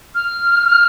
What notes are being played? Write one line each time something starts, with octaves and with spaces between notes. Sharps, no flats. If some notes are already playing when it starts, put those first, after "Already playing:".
F6